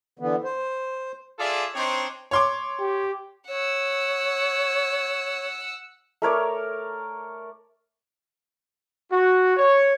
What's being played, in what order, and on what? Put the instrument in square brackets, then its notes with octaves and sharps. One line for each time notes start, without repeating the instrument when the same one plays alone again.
[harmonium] D3 E3 B3
C5
[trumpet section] F4 G#4 A4 D5 E5
C4 D4 D#4 C5 C#5
[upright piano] C#5 C6 D6
[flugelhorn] G4
[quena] C#5 [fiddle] F#5 E6
[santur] A3 A#4 C#5 D5
[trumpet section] F#4
C#5